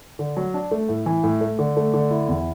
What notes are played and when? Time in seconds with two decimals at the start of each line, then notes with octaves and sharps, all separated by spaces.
0.19 D3
0.37 F#3
0.54 D4
0.71 A3
0.89 A2
1.06 E3
1.24 A2
1.41 A3
1.59 D3
1.77 A3
1.94 D3
2.11 E4
2.28 E2